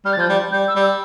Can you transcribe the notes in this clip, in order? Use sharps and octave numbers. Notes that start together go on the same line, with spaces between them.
G3 F6
A6
F3
G6
G3
G3 G6
E6
G3
E6